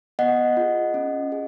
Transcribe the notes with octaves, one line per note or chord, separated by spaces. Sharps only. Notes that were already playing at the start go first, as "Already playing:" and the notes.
B3 D#5 F#5
F4 G#4
C#4
G#4